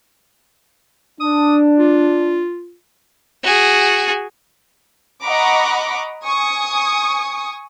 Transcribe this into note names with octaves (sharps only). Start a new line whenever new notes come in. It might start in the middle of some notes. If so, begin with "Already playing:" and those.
D4 D#6
F4
F#4 G#4
D#5 F#5 A#5 B5 C#6 D6
G#5 C#6 D#6